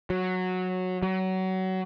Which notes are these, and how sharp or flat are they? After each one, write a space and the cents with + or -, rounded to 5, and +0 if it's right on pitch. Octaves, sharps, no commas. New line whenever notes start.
F#3 -10
F#3 +25